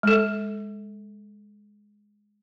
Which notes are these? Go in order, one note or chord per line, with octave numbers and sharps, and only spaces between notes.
G#3 A4